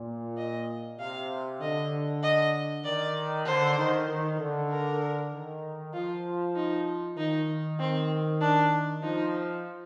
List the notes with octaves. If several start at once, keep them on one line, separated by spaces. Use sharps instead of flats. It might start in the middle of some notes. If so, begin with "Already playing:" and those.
Already playing: A#2
D#5
C3 F5
D3 D#5
D#5
D#3 D5
D3 C5
D#3
D#3
D3
A#4
D#3
F3 F4
D#4
D#3 D#4
C4
D4
F3 D#4